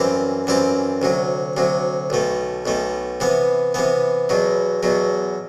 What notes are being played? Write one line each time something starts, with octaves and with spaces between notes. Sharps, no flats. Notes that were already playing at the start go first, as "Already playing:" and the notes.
Already playing: F#2 E3 G3 C4 G4
F#2 E3 G3 C4 G4
D2 C3 F#3
D2 C3 F#3
B1 B2 A3
B1 B2 A3
C3 E3 B3
C3 E3 B3
E2 B2 F#3
E2 B2 F#3